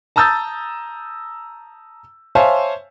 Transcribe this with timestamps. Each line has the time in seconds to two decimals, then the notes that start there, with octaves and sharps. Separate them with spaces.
0.16 A5 A#5 D#6 E6 G6 A6
2.35 C5 C#5 E5 F5 G#5 A5